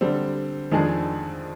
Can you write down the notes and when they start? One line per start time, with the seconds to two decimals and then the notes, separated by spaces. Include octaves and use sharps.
0.01 D3 G3 C4
0.71 F2 D#3 G#3 D4 G#4